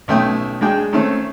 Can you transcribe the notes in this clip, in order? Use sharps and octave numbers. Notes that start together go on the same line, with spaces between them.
B1 A3 C#4 G5 D#6
G#3 D4 G#4 G5
D#3 A3 C4 C#4 A4